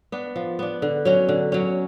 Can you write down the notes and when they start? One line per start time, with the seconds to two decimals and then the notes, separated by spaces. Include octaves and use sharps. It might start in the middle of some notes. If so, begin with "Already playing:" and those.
0.12 B3 D4
0.36 F3
0.59 B3 D4
0.82 D3
1.05 F#3 C#4
1.29 D3
1.52 F#3 C#4